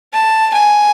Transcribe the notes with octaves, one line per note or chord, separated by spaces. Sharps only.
A5
G#5